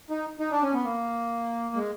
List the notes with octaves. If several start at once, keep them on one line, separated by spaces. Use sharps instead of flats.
D#4
D#4
D4
C#4
B3
A#3
G#3